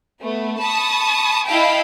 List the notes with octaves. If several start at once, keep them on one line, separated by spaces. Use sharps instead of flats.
A3 B3
A5 B5 C#6 D#6
E4 D#5 F5 G5 A5 B5